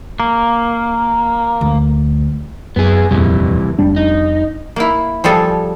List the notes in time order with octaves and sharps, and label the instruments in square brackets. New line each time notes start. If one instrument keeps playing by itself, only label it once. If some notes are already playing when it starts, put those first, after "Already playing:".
[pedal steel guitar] A#3
[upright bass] D2
[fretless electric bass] F#2 [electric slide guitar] B3 G#4
[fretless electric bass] D#1 F2 [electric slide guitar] C3 E3 G3
[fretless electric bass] F1 G3 D4
[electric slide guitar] D#4
[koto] A#3 E4
F3 G3 G#4 A4